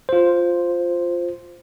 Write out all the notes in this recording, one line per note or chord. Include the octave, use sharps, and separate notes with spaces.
F4 C5